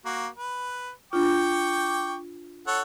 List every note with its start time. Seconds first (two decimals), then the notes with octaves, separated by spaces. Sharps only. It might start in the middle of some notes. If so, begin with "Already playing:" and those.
0.05 A#3 F#4
0.36 B4
1.13 D4 F4 G5 C#6 D6
2.67 A4 C#5 F#5